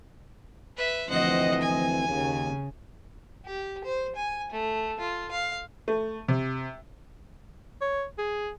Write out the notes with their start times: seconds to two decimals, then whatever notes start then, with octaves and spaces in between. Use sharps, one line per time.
0.77 B4 E5
1.09 D2 E3 F3 C4 C5 D#5 F#5
1.61 G#5
2.08 D#2 C#3
3.45 G4
3.84 C5
4.16 G#5
4.52 A3
5.00 F4
5.31 F5
5.88 A3
6.28 C3
7.82 C#5
8.18 G#4